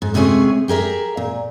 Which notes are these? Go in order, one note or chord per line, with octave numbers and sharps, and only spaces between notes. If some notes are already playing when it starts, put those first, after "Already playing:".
G#2
D#2 C3 G#3 A3 C#4 G#4
G4 G#4 A#4 E5
A#2